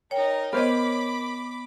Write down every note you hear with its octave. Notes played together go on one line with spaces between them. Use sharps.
D#4 A#4 C#5 G5
B3 A#4 C5 C#5 D#5 B5 D6